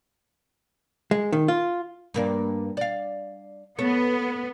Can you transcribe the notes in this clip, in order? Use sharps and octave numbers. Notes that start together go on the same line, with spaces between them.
G#3
D#3
F4
G2 A#3 D4
D5 F5
B3 A4 C#5